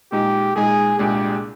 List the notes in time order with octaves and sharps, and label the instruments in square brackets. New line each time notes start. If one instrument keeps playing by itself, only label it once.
[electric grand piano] A#2 G#3 D#4 [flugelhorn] G4
[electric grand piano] A#2 G#3 D#4 [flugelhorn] G#4
[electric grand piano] C2 A#2 G#3 D4 G#4 [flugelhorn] G4